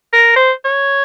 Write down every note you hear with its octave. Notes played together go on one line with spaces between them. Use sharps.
A#4
C5
C#5